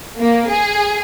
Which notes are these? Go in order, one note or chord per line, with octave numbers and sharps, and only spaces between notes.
A#3
G#4